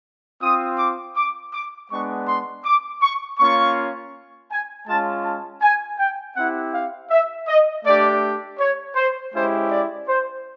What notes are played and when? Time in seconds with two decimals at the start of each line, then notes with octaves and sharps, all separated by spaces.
0.42 C4 F4 D#6
0.78 D6
1.16 D6
1.54 D6
1.91 G#3 B3 D4 C#6
2.28 C6
2.64 D6
3.02 C#6
3.39 A#3 C#4 F4 C#6
4.51 G#5
4.88 G#3 C#4 F4 A5
5.24 A5
5.62 G#5
5.99 G5
6.36 C4 E4 G4 F#5
6.74 F5
7.11 E5
7.48 D#5
7.84 A3 D4 G4 D5
8.60 C#5
8.96 C5
9.33 G#3 C#4 E4 G4 C5
9.71 D5
10.08 C5